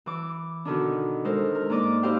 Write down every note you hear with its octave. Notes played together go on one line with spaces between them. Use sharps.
E3 D6
B2 D3 D#3 D4
G#3 A4 A#4 C5
A#4
G#2 A#3 D5 D#5 D6
D#4 E4 G4 C5 F5 G5